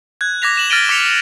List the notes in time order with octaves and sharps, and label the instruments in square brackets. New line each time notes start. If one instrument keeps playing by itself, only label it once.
[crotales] F#6 G#6
D6 G#6 A#6 B6 F7
E7 F#7
F6 A6 A#6 D7 D#7 G7
D6 B6 C#7 F7